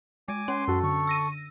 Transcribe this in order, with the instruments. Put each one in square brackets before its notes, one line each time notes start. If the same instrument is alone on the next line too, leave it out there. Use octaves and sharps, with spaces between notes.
[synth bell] G#3 [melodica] G#5 D6
[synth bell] C#4 [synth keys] C#5 [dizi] C6
[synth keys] F#2 F#4 [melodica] A4
[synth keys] D3 [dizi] C#6
[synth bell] E6 A#6 D#7